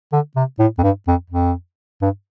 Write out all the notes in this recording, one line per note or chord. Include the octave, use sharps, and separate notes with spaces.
D3
C3
A2
F2
G2
F2
F2
G2